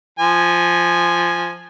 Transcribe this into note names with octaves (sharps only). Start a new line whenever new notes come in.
F3 G#5